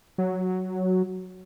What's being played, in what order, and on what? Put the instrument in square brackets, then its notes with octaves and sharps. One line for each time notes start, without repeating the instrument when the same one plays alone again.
[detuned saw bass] F#3